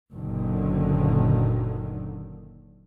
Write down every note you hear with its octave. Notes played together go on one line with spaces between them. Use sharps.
F#1 A#2 D3 D#3 F#3